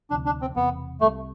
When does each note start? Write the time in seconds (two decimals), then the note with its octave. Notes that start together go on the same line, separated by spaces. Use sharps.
0.10 D2 C3 F3 D4
0.26 D4
0.41 C4
0.56 E1 E2 C3 B3
1.01 C2 C3 G3 A3